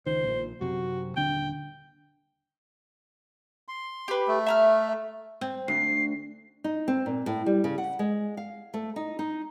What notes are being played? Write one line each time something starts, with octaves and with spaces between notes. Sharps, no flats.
C#2 D#3 C5
A#1 A#2
F#2 C3 F#4
D#1 D3 D4 G5
C6
G4 B4
A3
E5 A#5 F6
C4
D2 C7
D#4
C4
A#2
A2
G3
C#3
F#5
G#3
F5
A3
D#4
D#4